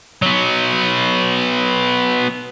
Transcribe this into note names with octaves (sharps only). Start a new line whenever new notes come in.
F#3 B3